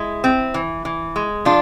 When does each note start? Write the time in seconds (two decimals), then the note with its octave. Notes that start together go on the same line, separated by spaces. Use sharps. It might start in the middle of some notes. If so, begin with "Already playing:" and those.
Already playing: G#3 E4
0.24 C4
0.54 E3
0.85 E3
1.16 G#3
1.45 F3 D4 F4